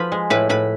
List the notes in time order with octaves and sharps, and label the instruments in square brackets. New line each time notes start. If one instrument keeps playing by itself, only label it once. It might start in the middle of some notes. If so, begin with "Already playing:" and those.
Already playing: [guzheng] F3 B4 B5
G#3
A2 B4 B5
A2 B4 B5